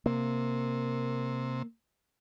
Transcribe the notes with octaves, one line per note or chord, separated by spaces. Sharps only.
C3 A#3